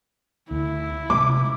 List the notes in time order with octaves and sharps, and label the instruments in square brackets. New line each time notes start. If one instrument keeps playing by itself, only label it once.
[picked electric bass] D2 [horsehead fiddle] E4
[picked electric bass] C3 G#3 [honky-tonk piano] D6